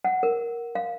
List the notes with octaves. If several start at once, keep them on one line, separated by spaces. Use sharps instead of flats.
F#5
A#4
F5